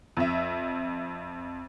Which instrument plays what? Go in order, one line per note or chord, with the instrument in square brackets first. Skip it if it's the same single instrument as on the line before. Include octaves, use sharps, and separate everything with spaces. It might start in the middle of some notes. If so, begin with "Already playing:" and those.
[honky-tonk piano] F2 E5